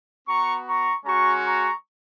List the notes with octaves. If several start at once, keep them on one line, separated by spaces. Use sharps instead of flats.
B3 F#4 A#5 C#6
A#5 C#6
G#3 C#4 F#4 A#5 C#6
A#5 C#6